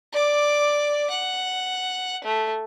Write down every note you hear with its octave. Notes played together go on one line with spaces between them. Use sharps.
D5 D6
F#5
A3